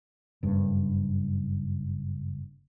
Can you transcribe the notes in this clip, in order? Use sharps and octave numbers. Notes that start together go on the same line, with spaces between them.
F#1 G2